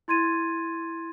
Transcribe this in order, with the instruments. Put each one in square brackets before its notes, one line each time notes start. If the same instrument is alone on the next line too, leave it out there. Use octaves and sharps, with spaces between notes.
[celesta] E4 C6 G#6 A6 D#7